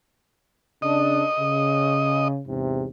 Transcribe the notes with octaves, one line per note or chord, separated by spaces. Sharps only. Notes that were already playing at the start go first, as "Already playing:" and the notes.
C#3 D4 D#5
C#3
E2 G#2 C3